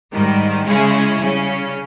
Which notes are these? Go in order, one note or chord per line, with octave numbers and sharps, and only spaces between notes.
G#2 D#3 G3
C#3 G#3 C#4 E4 G#4
C#3 G3 C#4